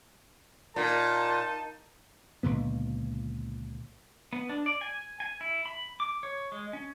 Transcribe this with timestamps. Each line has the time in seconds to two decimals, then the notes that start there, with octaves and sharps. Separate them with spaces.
0.76 A#2 D#4 A#4 A5
2.43 C#2 A#2 D3 B3
4.33 B3
4.49 D4
4.66 D5
4.81 G#5
5.20 G#5
5.41 E4
5.66 B5
6.00 D6
6.23 C#5
6.52 G#3
6.73 C#4